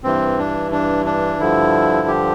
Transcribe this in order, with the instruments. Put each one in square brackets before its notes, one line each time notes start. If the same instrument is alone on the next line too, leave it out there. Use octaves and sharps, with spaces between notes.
[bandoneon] G2 E3 C4
D4
D4
D4
G2 D3 F3 E4
G4